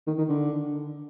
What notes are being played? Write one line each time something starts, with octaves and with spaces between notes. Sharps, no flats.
D#3
D#3
D3